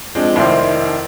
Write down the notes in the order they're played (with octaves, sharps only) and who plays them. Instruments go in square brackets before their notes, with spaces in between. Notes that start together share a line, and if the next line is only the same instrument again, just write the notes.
[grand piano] F3 G#3 C4 D4
F1 D#3 E4 C5 D5 C6